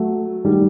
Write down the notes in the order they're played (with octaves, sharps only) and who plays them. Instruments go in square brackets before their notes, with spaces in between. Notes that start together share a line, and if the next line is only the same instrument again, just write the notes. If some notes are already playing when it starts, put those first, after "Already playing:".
Already playing: [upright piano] F#3 A3
D#3 G3